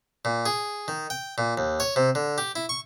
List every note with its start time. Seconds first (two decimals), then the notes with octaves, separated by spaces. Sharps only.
0.25 A#2
0.46 G#4
0.88 D#3
1.10 G5
1.38 A#2
1.57 D#2
1.80 C#5
1.96 C3
2.15 D3
2.38 G4
2.56 E4
2.69 C#6